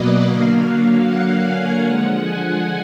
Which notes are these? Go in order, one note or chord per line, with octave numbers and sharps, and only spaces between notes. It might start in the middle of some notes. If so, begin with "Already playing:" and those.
Already playing: B2 F#3 A#3 B4 D5 D#5
D3 F#3 A#3 F5
F#5
G#5
D3 F3 G#3 F#5
G#5